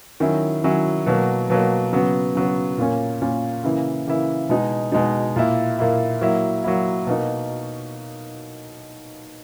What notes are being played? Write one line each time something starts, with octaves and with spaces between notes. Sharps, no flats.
D#3 F#3 C#4 E4
D#3 F#3 C#4 E4
B2 F#3 A#3
B2 F#3 A#3
C#3 F#3 B3
C#3 F#3 B3
A#2 A#3 C#4
A#2 A#3 C#4
C#3 E3 A#3 E4
C#3 E3 A#3 E4
B2 G#3 D#4
B2 G#3 D#4
A#2 A#3 E4
A#2 A#3 E4
F#3 A#3 E4
F#3 A#3 E4
B2 A#3 D#4